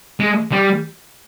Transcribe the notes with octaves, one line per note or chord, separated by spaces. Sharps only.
G#3
G3